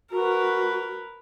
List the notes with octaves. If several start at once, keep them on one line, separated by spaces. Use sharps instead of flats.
F#4 A#4 B4